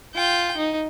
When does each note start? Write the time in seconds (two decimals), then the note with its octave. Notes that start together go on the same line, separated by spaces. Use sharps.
0.14 F4 G5
0.57 D#4